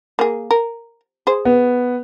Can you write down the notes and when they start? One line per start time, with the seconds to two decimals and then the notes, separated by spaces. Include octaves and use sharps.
0.19 A#3 G#4
0.51 A#4
1.27 G#4 C5
1.45 B3